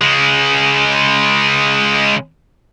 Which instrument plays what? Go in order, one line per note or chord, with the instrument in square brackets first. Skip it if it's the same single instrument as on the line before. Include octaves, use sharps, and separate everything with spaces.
[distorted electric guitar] C#3 G#3